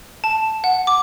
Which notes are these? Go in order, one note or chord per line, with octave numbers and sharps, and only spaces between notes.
A5
F#5
D6